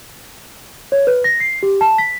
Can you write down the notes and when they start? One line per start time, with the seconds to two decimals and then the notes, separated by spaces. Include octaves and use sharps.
0.92 C#5
1.07 B4
1.24 A#6
1.40 C7
1.63 G4
1.81 A5
1.98 B6